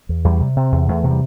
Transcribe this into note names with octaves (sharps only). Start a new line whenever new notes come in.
E2
E2 G3
C3
C3 C4
E2
E2 A3
C3
G3